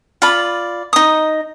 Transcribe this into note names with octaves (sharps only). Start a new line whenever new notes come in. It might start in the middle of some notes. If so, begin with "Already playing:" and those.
F4 D5 B5
D#4 D#6